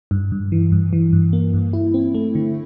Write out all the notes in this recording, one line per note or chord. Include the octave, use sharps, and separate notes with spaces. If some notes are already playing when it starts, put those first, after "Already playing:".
G2
G2
E3
G2
E3
G2
A#3
G2
E4
C4
A3
D3